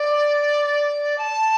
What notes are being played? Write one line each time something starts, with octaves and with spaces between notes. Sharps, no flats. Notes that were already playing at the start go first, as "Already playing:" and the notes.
Already playing: D5
A5